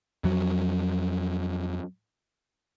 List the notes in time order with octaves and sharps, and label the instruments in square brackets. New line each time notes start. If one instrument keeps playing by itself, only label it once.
[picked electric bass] F2 F#3